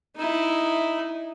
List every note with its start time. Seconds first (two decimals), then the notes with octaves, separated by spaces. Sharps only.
0.16 D#4 E4